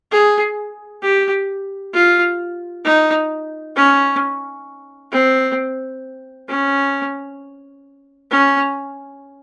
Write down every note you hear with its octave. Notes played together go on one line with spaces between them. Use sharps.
G#4
G4
F4
D#4
C#4
C4
C#4
C#4